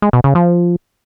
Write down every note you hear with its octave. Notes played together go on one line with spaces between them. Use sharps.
G#3
B2
C#3
F3